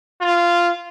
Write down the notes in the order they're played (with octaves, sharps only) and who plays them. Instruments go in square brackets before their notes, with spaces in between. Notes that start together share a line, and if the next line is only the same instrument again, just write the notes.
[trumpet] F4